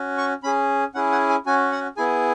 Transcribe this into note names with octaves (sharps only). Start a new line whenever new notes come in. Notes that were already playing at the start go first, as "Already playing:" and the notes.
Already playing: C#4 F#4
C#6
C#4 G#4 B5
C#4 E4 G#4 F#5
F#5
G#5
C#4 F#4 G#5
F#5
B3 E4 G#4 G#5